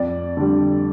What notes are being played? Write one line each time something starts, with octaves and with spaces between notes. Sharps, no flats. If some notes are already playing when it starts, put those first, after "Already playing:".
Already playing: F2 D5
D3 G3